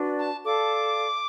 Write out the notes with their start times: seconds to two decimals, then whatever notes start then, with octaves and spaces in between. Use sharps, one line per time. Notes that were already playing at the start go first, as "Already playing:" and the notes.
Already playing: D4 F#4 B4 D5
0.19 A5
0.45 A4 D5 F5 A5 D6